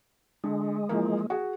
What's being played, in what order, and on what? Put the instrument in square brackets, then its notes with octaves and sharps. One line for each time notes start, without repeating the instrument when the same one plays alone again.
[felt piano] D3 [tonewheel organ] G#3
[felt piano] E3 F3 A#3
F#4 G#4